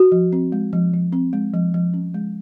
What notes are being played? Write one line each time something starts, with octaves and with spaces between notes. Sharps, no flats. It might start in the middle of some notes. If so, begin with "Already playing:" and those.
Already playing: F#4
F3
C4
G#3
F3
F3
C4
G#3
F3
F3
C#4
G#3